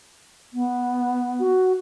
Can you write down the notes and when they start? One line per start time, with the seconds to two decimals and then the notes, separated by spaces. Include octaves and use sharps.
0.53 B3
1.39 F#4